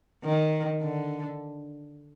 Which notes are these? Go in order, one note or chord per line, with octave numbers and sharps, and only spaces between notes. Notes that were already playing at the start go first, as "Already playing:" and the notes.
D#3
D3